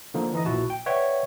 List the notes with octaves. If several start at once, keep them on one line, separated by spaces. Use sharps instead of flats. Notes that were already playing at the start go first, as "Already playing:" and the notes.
D3 F3 A#3 D#4
E3 D#4 D#5
A#1 A#2 E4 F#4 A5
G5
B4 C#5 D5 E5 F#5 G5